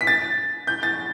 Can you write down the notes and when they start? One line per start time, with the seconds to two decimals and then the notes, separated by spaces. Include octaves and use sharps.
0.01 B6
0.07 A6
0.67 G6
0.83 A6